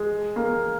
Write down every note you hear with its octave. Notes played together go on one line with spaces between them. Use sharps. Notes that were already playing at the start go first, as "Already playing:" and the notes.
Already playing: G#3
A#3